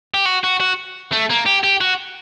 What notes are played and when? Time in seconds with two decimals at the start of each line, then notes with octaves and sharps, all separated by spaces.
0.14 G4
0.25 F#4
0.44 F#4
0.60 F#4
1.12 A3
1.30 A#3
1.46 G4
1.63 G4
1.81 F#4